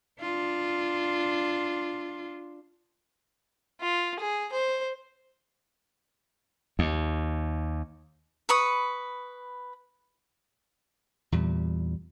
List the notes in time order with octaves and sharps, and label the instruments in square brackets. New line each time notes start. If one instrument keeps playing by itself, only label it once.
[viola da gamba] D4 F4
[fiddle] F4
G#4
C5
[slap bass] D#2
[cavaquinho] B4 B5 C#6 D#6
[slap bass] E2 A#2 G3